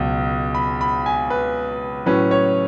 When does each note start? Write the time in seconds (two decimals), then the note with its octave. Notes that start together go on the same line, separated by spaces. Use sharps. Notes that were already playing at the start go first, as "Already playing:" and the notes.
Already playing: C#2 B2 F#3
0.55 B5
0.81 B5
1.06 G#5
1.30 B4
2.06 A2 F#3 C#4 B4
2.31 C#5